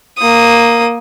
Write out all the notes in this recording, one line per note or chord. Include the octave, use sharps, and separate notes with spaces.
A#3 D#6